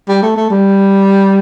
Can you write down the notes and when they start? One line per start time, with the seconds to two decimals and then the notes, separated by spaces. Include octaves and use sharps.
0.09 G3
0.22 A3
0.36 A3
0.50 G3